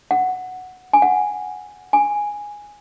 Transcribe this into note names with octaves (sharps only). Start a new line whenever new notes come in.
F#5
G#5
F#5
G#5